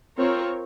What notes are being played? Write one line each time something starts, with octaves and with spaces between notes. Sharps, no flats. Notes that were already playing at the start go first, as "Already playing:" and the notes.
C4 F4 A#4 C#5